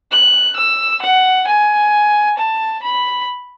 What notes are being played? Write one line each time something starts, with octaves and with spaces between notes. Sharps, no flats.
F#6
E6
F#5
G#5
A5
B5